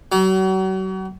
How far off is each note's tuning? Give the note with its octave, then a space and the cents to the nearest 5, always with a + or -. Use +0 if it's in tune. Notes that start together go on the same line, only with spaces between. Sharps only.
F#3 +40